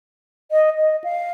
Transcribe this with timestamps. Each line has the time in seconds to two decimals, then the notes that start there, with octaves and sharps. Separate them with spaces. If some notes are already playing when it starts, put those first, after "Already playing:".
0.51 D#5
0.78 D#5
1.04 F5